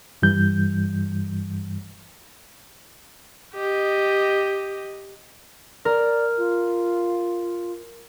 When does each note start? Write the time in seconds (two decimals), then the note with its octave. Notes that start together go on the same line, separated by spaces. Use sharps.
0.22 G2 E3 G3 G6
3.54 G4 D#5
5.85 A#4 D5
6.38 F4